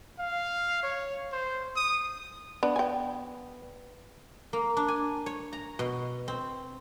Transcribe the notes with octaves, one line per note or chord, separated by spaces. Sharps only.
F5
C#5
C5
D#6
B3 D4
G5 G#5
A#3
D4
G#5
C#5
A#5
B2
C4